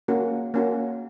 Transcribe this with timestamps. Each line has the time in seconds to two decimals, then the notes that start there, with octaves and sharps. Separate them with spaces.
0.08 A#3 C#4 F#4
0.54 A#3 C#4 F#4